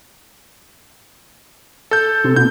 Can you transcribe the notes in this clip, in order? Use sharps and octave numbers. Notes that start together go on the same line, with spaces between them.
A4 G6
C3
B2 G6